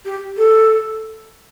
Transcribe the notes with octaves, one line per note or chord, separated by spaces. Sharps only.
G4
A4